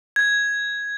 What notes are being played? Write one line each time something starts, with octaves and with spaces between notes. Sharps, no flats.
G#6